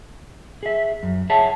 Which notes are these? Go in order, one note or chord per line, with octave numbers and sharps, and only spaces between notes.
G#4 E5
F#2
G#4 C#5 E5 F#5 A5